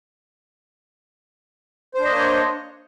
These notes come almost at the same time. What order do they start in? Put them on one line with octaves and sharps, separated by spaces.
C5 D4 D#5 A#3 C#5